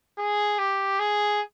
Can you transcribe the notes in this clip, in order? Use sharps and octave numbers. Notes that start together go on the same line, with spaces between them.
G#4
G4
G#4